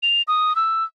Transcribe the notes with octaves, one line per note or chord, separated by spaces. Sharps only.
F7
D#6
E6